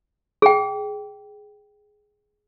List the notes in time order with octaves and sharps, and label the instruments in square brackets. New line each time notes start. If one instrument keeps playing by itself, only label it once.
[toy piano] G#4 G5